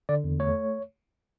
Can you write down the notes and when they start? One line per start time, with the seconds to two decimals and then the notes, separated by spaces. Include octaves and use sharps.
0.09 D3 D5
0.24 E2
0.39 A3 C#5